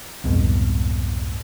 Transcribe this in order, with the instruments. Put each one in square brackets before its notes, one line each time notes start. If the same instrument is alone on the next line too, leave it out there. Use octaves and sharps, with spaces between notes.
[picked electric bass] C2 F2 G#2 B2